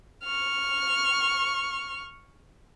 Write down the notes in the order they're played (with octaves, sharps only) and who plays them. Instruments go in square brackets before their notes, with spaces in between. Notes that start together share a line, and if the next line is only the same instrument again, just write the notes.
[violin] C#6 F6